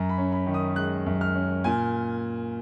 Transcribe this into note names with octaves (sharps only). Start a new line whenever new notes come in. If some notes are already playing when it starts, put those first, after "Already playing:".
Already playing: F#2 A#5
B5
C#4
B5
D#3
D#6
G#3 F#6
F#2
F6
C#4
A#2 G#5